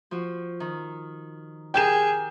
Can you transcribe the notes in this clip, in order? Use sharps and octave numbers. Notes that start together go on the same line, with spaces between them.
F3 F#4
D#3
G4 G#4 A#4 G5 G6 E7